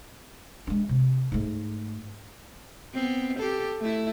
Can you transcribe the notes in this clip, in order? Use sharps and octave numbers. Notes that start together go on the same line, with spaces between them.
G#3 D4
C3
G#2 A3
B3 C4
G4 A4
A3 E4